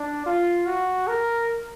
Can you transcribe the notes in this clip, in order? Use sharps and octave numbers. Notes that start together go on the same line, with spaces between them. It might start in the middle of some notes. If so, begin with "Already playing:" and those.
Already playing: D4
F4
F#4
A#4